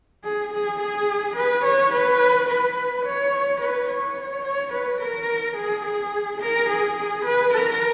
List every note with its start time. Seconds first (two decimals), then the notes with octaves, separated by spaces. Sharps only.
0.24 G#4
0.53 G#4
0.80 G#4
1.36 B4
1.64 C#5
1.93 B4
2.49 B4
3.06 C#5
3.61 B4
3.89 C#5
4.45 C#5
4.73 B4
5.01 A#4
5.57 G#4
5.85 G#4
6.41 A#4
6.69 G#4
6.97 G#4
7.25 B4
7.54 A#4